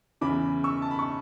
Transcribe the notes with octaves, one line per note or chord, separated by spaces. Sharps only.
E2 C#3 E3 B5 D6
C#6 E6
A5
B5
C#6